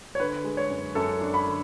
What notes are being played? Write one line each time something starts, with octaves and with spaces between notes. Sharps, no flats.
C#5
D3 B4
G#3
C#5
F#2
F#2 A4
D4
B5
D3